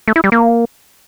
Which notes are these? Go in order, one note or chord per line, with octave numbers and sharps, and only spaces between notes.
A3
E4
G3
A#3